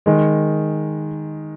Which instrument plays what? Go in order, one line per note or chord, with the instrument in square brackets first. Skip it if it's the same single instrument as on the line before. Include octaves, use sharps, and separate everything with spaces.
[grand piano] D#3 G#3